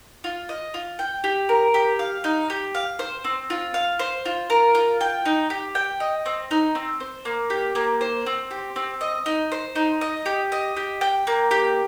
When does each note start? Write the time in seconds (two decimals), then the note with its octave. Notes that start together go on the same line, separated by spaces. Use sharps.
0.24 F4
0.49 D#5
0.74 F4
0.99 G5
1.24 G4
1.49 A#4
1.74 G4
1.99 F5
2.24 D#4
2.50 G4
2.75 F5
2.99 C5
3.24 C4
3.50 F4
3.74 F5
3.99 C5
4.25 F4
4.50 A#4
4.75 F4
5.01 G5
5.25 D#4
5.50 G4
5.75 G5
6.00 D#5
6.26 C4
6.51 D#4
6.75 C4
7.00 C5
7.25 A#3
7.50 G4
7.75 A#3
8.01 C5
8.26 C4
8.51 G4
8.76 C4
9.01 D#5
9.26 D#4
9.52 C5
9.76 D#4
10.01 D#5
10.26 G4
10.52 D#5
10.76 G4
11.01 G5
11.27 A#3
11.51 G4